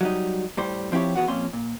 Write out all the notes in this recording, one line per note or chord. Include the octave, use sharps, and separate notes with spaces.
F#3 G3 D#4
A2 G3 C5
F3 C4 E4 G4 C#5
E2 B2 B3 F#4 F#5
F2 A#2 F3 C#4 C6
A#2